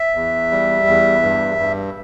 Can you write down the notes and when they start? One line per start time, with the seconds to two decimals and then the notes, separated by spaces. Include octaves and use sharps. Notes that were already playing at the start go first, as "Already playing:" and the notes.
Already playing: E5
0.15 E2
0.51 G3
0.87 E2
1.22 G2
1.58 G2